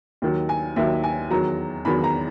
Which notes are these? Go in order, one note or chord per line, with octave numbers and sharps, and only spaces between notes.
D#2 D#3 F#3
G#5
D#2 D#3 F#3 E5
G#5
E2 D#3 F#3 A#5
E2 D#3 F#3 B5
A#5